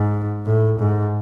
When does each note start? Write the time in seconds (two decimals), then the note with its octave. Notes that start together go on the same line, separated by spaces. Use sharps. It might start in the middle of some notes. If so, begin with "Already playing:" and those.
Already playing: G#2
0.46 A2
0.80 G#2